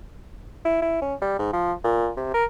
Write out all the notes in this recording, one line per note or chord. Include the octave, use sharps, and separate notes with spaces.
E4
E4
C#4
G3
G#2
F3
A#2
C3
A#4